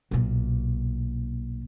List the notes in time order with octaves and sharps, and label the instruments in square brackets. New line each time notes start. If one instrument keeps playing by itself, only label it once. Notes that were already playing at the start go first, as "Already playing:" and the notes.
[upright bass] B1 A#2